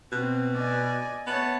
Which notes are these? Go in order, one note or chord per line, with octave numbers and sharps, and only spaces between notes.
B2 C4
D5 D#5 G#5
B3 C#5 E5 A5